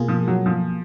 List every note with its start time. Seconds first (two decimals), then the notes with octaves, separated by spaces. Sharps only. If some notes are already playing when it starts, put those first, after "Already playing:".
Already playing: B2 A#3 F4 G#4
0.08 F3
0.28 F#3
0.46 F3